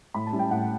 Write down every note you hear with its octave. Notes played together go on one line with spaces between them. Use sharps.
A2 B5
A5
G3 C#4 E4
G5
A2 F#5